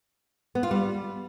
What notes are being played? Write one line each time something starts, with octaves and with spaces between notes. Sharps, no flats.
B3
F4
G3